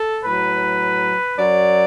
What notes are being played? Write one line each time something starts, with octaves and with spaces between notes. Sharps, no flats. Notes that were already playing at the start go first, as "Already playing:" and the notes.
Already playing: A4
A2 F#3 B4
F#2 F#3 D5